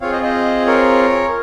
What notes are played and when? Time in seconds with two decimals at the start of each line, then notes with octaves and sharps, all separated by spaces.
0.01 C4 F4 G#4 C#5 F5
0.12 C5 D#5
0.23 C5 D#5
0.67 A#4 C#5